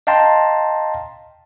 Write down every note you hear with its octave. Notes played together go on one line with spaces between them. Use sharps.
D#5 F5 G5 A5 A#5 C6